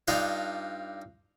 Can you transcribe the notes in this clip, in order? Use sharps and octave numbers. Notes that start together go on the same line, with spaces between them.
G2 D4 D#4 F4 F5